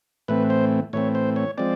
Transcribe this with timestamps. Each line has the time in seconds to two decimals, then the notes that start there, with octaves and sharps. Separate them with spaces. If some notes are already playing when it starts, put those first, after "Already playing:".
0.28 A2 E3 A3 C4 B4
0.50 C5
0.93 A2 E3 A3 C4 C#5
1.15 C5
1.36 C#5
1.58 F3 G#3 C4 D5